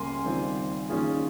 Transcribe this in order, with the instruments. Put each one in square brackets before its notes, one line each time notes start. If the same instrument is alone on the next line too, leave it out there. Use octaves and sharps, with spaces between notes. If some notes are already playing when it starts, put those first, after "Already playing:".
Already playing: [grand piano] C#2 C#3 G3 A#3 [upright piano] G#5 C6
[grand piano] D#3 G3 C4 F4
D#3 A#3 C#4 F4 G#4